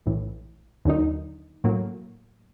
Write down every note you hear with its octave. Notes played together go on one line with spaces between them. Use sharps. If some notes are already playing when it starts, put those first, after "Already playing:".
A#1 A2 E3
D#2 D3 F#3 A#3 D#4
A2 F#3 A#3